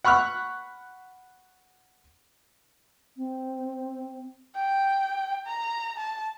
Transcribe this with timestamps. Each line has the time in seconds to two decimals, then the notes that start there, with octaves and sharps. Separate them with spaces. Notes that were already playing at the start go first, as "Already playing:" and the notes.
0.04 F#5 B5 C#6 F6 F#6
3.17 C4
4.55 G5
5.46 A#5
5.98 A5